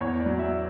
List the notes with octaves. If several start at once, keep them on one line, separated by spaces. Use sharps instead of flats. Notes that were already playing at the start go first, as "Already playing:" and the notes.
E2 C#5
D5
F#3
E5